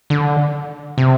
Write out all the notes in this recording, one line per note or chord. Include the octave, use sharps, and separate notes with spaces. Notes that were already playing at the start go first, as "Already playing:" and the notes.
D3
C3